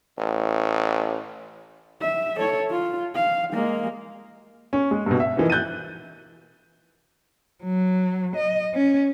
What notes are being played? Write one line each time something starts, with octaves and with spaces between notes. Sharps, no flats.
A1
E5
A4 C#5
F4
F5
G#3 A#3
C#4
G#3
G2 B2
E5
E3 F3 A#3 D#4
F#6 G6 A6 D#7
F#3
D#5
C#4